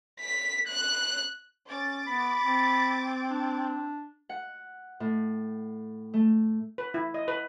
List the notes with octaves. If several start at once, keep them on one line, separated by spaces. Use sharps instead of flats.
B6
F#6
C#4 D6 A6
B3 B5
C4
D4
F#5
A2
A3
B4
E4
D#5
B4